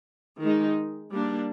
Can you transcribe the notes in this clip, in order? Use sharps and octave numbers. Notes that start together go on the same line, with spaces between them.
D#3 G#3 D#4
G3 A#3 D4